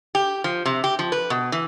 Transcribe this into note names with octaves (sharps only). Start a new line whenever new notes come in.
G4
F3
C3
G4
F3
B4
B2
E3